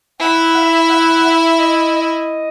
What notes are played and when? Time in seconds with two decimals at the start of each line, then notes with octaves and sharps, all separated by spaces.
0.20 E4 F#5
0.56 E5
0.82 E5
0.90 F#5
1.25 E5
1.60 D#5
1.95 D#5